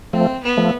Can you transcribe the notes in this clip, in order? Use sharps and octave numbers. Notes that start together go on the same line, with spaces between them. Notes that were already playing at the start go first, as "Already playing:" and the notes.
F3 A3 C4
B3
F3 A3